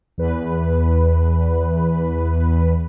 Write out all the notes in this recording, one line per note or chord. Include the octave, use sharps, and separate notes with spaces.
E2 B4